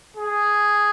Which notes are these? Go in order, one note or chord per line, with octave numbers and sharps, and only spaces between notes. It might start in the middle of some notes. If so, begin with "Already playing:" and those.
G#4